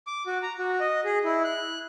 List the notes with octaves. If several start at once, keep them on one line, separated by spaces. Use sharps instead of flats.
D6
F#4
A#5
F#4
D#5
G#4
E4
F#6